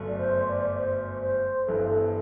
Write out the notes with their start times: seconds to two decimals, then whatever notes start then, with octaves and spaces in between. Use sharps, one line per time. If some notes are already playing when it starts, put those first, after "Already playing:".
Already playing: G1 F#2 D3 A3
0.08 D5
0.19 C5
0.48 D5
0.78 C5
1.22 C5
1.67 G1 G2 E3 B3 E4 A4
1.89 A4